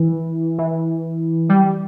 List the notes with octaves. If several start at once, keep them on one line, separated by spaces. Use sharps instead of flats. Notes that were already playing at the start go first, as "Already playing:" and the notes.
Already playing: E3
E3
G3